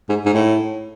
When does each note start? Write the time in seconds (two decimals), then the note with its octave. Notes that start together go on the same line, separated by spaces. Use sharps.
0.09 G#2
0.25 G#2
0.33 A2